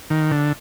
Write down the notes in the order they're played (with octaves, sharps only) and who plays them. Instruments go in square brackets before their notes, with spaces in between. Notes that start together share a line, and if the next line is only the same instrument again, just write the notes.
[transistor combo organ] D#3
D3